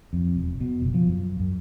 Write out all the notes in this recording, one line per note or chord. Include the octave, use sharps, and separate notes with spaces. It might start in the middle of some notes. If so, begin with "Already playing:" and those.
F2
E1
B2
F#1
F3
F#2
F#2